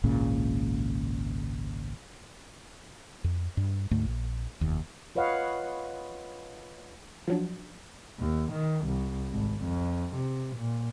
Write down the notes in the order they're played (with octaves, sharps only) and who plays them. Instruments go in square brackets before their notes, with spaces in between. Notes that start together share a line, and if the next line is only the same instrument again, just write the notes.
[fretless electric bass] G#1 C#2 A#2 C#3
F2
G2
D2 G#2 A3
A#1
F1 D#2
[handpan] F4 B4 C#5 D#5 F5 F#5
[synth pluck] F3 F#3 D4
[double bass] D#2
D#3
C2
G#1
F2
C3
A#2